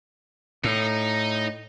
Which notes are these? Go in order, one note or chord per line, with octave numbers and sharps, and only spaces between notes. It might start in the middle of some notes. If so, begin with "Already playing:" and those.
A2 D#4